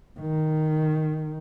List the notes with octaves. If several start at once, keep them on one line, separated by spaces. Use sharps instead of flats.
D#3